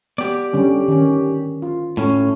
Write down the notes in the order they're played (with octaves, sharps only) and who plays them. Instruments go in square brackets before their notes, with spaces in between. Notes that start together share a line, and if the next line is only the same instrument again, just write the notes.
[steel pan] B3 [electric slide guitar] G4 D5
[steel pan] D3 G3 C#4
D#3 C#4
F4
[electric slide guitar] A2 C#4